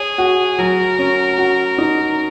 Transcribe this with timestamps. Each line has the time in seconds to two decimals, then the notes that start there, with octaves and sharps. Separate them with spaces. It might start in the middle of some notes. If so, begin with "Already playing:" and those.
Already playing: G#4 C#5
0.18 F#4
0.58 F#3 A#4
0.99 C#4
1.38 F#4
1.78 D#4